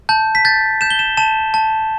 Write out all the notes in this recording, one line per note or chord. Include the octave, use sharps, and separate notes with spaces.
A5 G6
B6
G6 A6
G6 E7
G7
E7
A5 E7
A5